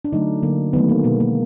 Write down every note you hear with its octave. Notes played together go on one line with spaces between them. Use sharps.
D4
D3 F#3 A3 D#4
D3 F#3 A#3
D#3 F#3 A3 B3
A#3
B2 G#3 B3
A#3